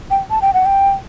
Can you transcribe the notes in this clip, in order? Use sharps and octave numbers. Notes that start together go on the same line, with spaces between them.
G5
A5
G5
F#5
G5